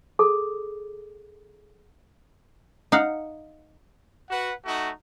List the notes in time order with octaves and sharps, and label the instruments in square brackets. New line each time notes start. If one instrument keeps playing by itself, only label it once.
[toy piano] G#4 A4
[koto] D#4 F5 F#5
[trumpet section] F#4 B4 F#5
A3 D#4 F#4